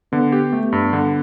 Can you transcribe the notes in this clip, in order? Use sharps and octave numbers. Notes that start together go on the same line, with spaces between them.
D3 B3
G4
A3
G2
D3